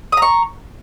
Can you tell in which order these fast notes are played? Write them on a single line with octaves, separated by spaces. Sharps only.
D#6 A#5 C#6